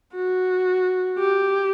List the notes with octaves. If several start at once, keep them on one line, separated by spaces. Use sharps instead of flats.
F#4
G4